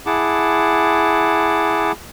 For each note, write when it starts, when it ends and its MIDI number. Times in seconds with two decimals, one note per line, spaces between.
0.06 1.92 64
0.06 1.92 68
0.06 1.92 78
0.06 1.92 81
0.06 1.92 86